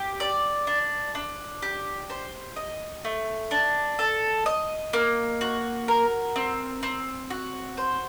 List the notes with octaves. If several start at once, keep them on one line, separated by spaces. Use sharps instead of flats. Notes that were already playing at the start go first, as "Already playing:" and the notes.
Already playing: G4
D5
D4
D4
G4
C5
D#5
A3
D4
A4
D#5
A#3
F#4
A#4
C4
C4
F#4
C5